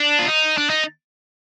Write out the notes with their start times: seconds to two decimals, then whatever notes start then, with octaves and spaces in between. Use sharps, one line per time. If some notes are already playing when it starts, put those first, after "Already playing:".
Already playing: D4
0.19 F4
0.27 D#4
0.58 D4
0.70 D#4